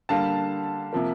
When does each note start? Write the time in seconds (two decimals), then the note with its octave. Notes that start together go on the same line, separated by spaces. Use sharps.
0.09 D3 G3 A#3 F5 A5
0.93 C3 F3 A#3